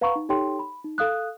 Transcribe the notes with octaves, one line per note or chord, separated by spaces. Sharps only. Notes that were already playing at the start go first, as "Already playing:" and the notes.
B4 F5 F#5 A#5 B5 C#6
D#4
D#4 G4 A4 C#5 G5 C6
B5
D#4
A4 F5 D#6 F#6